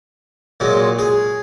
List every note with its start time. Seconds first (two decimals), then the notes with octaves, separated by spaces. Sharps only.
0.60 A#2 F#3 G#3
0.99 G#4